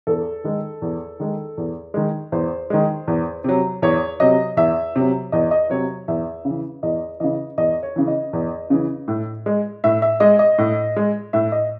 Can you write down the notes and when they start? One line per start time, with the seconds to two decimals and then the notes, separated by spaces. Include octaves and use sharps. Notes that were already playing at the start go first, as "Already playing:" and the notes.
0.07 E2 A4
0.44 D#3 G#3
0.82 E2
1.20 D#3 G#3
1.58 E2
1.94 D#3 G#3
2.32 E2 C5
2.70 D#3 G#3
3.08 E2
3.44 C3 F#3
3.82 E2 C#5
4.20 C3 F#3 D#5
4.57 E2 E5
4.96 C3 F#3
5.32 E2 D#5
5.51 D#5
5.70 C3 F#3 C#5
6.08 E2 E5
6.45 C#3
6.50 E3
6.83 E2 D#5
7.20 C#3 E3 D#5
7.58 E2 D#5
7.83 C#5
7.96 C#3 E3
8.07 D#5
8.33 E2
8.70 C#3 E3
9.08 A2
9.46 G#3
9.84 A2 E5
10.02 E5
10.20 G#3 D#5
10.39 D#5
10.58 A2
10.96 G#3
11.33 A2 E5
11.52 D#5